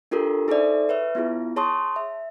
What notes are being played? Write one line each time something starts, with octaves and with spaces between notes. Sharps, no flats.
D4 F4 G4 A4 A#4
D#4 G#4 A4 C5 D5 E5
B4 C#5 E5
B3 E4 F4 G#4
G#4 C#5 A5 C6 C#6 D#6
E5